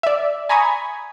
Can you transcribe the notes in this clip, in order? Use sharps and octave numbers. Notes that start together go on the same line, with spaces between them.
D5 E5
G#5 A#5 B5 C#6 D#6 G#6